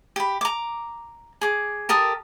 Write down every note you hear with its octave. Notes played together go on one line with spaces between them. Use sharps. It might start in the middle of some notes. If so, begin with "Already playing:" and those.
G4 B5
A#5 D6
G#4 D6
G4 A4 A#4 D#6